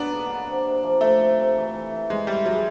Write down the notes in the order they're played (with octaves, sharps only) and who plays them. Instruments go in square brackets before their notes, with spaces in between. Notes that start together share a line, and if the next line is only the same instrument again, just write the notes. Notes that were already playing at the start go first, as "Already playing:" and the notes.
Already playing: [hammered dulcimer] F#3 A#3 [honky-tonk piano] B3 D4
[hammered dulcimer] D3
A#3
C3
C3
F3
[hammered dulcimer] F3 [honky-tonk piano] A3
[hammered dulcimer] C3
C3
E3
E3
E3
[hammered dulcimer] E3 [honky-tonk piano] G#3
[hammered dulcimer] E3 [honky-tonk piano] G3
[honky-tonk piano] F#3 [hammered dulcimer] G#3